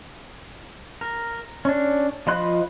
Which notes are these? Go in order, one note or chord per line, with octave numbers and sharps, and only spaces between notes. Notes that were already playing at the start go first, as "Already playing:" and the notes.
A#4
C#4 D4
F3 F4 D#5 B5 F#6